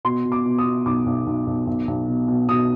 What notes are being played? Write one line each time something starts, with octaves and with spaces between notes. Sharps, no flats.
B2 C6
B2
D6
B2
D#6
B2
B1 D6
B1
B1
B1
B1
B1
B2
B2
B2 D#6